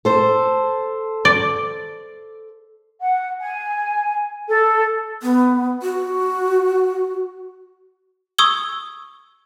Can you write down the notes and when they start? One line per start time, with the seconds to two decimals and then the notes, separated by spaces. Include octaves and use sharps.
0.05 A4 C5
1.25 D5
3.01 F#5
3.41 G#5
4.49 A4
5.22 B3
5.82 F#4
8.38 C#6 D#6 E6 G#6 G7